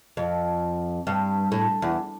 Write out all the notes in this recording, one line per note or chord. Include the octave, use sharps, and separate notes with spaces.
F2
G2
A2
E2